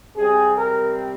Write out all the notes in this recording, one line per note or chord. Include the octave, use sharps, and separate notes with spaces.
C3 G3 C4 G#4
A#4